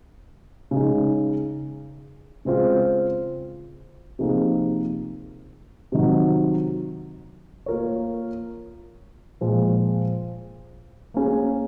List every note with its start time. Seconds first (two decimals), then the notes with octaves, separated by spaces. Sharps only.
0.71 C#3 G#3 D#4
2.45 C#3 G#3 C4 F4
4.19 C3 F3 A#3 D#4 G#4
5.92 C3 D#3 F#3
7.66 A#3 F4 A#4 C#5
9.41 A#2 F3 G#3
11.14 A#3 C#4 G#4